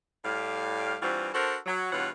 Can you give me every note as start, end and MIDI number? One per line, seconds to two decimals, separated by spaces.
0.24 0.96 45
0.24 0.96 55
0.24 0.96 77
1.01 1.29 43
1.01 1.29 52
1.01 1.29 55
1.01 1.29 60
1.01 1.29 65
1.01 1.29 66
1.34 1.56 62
1.34 1.56 66
1.34 1.56 69
1.34 1.56 70
1.34 1.56 72
1.66 1.92 54
1.92 2.08 43
1.92 2.08 47
1.92 2.08 52
1.92 2.08 65
1.92 2.08 73
1.92 2.08 78